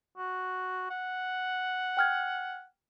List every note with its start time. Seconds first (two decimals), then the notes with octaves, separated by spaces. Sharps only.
0.18 F#4
0.90 F#5
1.97 G5 F6 G#6